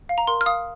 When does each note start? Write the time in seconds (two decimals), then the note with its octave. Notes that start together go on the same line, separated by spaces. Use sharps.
0.09 F5
0.18 A#5
0.27 A#4 C6
0.41 F6
0.46 F5 D#6